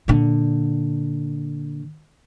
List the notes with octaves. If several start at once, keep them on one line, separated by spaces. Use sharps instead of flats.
A#2 D3